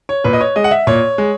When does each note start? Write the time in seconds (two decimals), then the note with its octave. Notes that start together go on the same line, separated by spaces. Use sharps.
0.09 C#5
0.24 A#2 B4
0.33 D#5
0.41 C#5
0.56 G#3 D#5
0.64 F#5
0.71 E5
0.87 A#2 C#5
1.18 G#3